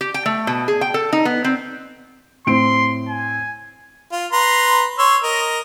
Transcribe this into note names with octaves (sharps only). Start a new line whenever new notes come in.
G4
G5
A3
B2
G#4
G5
A4
D#4
B3
C4
A2 C4 C6 D7
G#5
F4
B4 A#5 C6
C#5 C6 E6
A#4 D#5